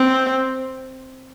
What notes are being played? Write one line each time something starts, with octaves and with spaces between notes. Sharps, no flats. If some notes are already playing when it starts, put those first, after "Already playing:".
Already playing: C4